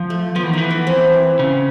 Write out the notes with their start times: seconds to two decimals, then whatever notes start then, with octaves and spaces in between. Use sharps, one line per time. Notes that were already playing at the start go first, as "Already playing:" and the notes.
Already playing: F3
0.10 A3
0.36 F3 B3
0.43 E3
0.50 D#3
0.53 E3 B3
0.70 B3
0.87 C4
1.39 C#3